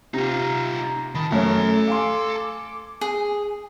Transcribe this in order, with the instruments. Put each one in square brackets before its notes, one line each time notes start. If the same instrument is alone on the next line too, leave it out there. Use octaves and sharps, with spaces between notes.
[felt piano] C3 [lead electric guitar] D#4 F4 [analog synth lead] A#5
[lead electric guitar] D#3 [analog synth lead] A5 [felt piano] B5
[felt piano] F#2 C#5 [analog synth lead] A3 [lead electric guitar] A4 A#5
[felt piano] F5 G#5 C6 [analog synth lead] D6
[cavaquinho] G#4